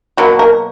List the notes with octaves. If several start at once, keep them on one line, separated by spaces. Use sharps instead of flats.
B2 F#3 A#3 F#4
A#4